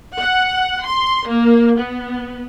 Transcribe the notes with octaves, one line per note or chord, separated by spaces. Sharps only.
F#5
C6
A#3
B3